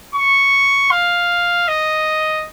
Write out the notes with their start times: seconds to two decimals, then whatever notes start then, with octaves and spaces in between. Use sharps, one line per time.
0.15 C#6
0.91 F5
1.68 D#5